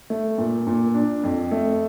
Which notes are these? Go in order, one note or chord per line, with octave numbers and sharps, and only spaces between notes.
A3
A#2
A#2
D4
F2
A3